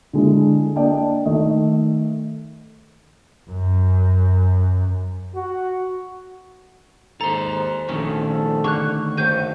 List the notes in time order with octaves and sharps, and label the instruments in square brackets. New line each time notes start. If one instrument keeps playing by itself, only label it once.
[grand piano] D3 G#3 E4
A#3 D4 D5 D#5 G5 A5
D#3 A3 D#5
[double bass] F#2
[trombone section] F#4
[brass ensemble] D#2 G#2 [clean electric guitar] A4 C5 [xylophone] A#5
[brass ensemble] A#1 A4 [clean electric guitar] D#3 A3 [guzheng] C#4
[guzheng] D3 A#3 C#5 [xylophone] C#6 F#6
[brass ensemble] F#1 G2 [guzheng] D#3 F#3 [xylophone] C5 G6 D#7